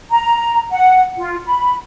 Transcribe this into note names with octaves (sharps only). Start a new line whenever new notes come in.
A#5
F#5
F4
B5